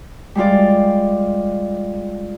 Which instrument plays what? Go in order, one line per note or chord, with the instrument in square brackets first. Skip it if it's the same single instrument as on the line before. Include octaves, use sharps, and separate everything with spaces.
[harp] G3 G#3 F4 D5